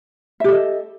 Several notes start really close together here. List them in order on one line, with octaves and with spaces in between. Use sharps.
E5 G4 A4 D#5